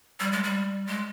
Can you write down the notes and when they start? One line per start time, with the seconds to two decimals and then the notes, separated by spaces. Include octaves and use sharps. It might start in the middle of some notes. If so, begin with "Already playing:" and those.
0.20 G3
0.32 G#3
0.43 G3
0.87 G#3